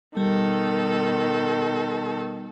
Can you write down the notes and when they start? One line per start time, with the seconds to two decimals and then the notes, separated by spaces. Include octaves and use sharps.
0.17 B2 D#3 G3 A4